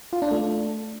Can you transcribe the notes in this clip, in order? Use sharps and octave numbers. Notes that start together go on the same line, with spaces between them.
F4
D4
A3